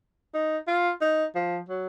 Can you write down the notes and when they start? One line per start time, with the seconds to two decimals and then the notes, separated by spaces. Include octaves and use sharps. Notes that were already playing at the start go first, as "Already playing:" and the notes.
0.34 D#4
0.67 F4
1.01 D#4
1.35 F3
1.69 F#3